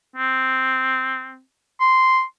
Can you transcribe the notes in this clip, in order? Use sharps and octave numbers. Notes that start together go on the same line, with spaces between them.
C4
C6